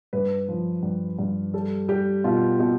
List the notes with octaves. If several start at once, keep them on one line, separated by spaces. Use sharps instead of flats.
G2 B4
F3
G2
G2
G3 A4
G3 G4
B2 F4
B2 G4